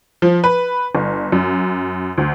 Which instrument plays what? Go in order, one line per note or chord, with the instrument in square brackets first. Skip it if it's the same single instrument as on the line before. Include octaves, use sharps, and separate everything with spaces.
[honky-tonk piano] F3
B4
G1
F#2
D2